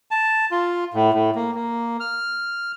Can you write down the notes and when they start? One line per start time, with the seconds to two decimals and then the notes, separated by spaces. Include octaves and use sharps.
0.11 A5
0.51 F4
0.94 A2
1.14 A2
1.35 A#3
1.55 A#3
2.00 F6